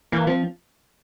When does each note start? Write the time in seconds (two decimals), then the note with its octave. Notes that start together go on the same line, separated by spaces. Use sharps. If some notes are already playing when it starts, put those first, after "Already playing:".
0.12 E3 A#3
0.27 F3 C4